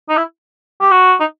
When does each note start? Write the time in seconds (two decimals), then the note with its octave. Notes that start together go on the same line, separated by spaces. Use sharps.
0.09 D#4
0.17 E4
0.81 G4
0.91 F#4
1.20 D#4